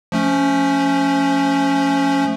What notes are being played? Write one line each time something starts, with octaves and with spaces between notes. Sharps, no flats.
F3 A3 C#4